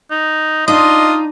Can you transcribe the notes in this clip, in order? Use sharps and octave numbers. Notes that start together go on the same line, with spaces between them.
D#4
D4 D#4 F4 D#5 C6 D#6